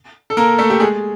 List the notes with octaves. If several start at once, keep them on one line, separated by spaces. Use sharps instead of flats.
A4
A#3 A#4
A3 A4
G4
G#3 G#4